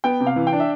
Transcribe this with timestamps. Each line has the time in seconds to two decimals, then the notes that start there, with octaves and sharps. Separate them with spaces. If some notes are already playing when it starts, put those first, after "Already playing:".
0.04 B3 G5
0.20 C3
0.26 F5
0.36 E3
0.47 G5
0.53 D4
0.60 E5